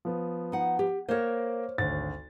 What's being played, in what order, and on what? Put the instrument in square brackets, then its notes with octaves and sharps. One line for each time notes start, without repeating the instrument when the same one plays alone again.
[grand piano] F3 B3
[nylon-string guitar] D#4 F#5
G4
[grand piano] A#3 A#4 [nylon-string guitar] C5 C#5
[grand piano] G#1 D2 A6